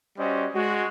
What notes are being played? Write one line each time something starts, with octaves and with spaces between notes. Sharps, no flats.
G3 C#4 F#4 C5 D5 D#5
G#3 F#4